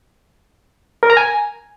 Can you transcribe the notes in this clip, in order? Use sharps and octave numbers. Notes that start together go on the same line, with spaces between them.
A#4
A#5
G#5